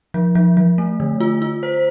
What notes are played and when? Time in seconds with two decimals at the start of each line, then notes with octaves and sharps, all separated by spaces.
0.14 F3
0.35 F3
0.57 F3
0.78 A3
1.00 D3
1.20 F4
1.42 F4
1.63 C5